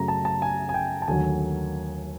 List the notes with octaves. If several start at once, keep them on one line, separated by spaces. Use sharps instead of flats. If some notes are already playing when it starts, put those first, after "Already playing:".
Already playing: F#2 C#3 F#3 A3 A#5
A5
A5
G#5
G#5
G5
A5
D#2 D3 F#3 A3 G#5